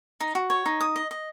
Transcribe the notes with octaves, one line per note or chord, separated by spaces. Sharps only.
D#4
F#4
C#5
D#4
D#6
D#5
D#5